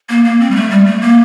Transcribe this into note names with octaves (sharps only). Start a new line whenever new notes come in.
A#3
A#3
C4
G3
A3
G3
A3
A#3